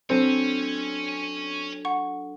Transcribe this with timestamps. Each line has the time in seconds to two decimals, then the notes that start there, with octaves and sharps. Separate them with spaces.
0.10 F#3 C4 D4 A4 C#5 G#5
1.85 F#5 C#6